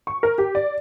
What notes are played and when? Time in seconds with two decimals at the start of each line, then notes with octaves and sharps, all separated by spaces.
0.07 C#6
0.23 A#4
0.38 G4
0.55 D5